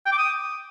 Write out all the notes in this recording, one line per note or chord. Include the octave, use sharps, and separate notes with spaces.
G5
D6
D#6